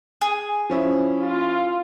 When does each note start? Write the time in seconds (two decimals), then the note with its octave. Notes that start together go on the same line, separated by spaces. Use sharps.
0.21 G#4
0.70 F3 C#4 E4
1.23 F4